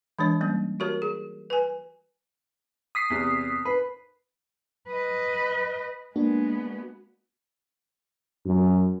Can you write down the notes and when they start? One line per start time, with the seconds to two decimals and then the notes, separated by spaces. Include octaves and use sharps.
0.19 E3 G#3 D4 C#5
0.40 G3 A#3 C#4
0.80 F#4 G4 A#4 C#5
1.02 G#4
1.50 B4 G#5
2.95 D#6 B6 C7
3.10 E2 C3
3.65 B4
4.89 B4 D#5
6.16 G#3 A#3 B3 D4 F#4
8.46 F#2